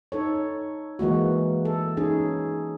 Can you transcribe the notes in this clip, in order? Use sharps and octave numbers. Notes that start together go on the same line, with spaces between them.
D#4 A4 C#5
E3 G#3 A#3 F#4
A4
C#4 D#4 G#4